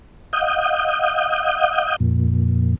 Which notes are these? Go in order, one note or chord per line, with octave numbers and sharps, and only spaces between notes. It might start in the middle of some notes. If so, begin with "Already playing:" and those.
D#5 F5 F#5 D#6 G6
F2 A#2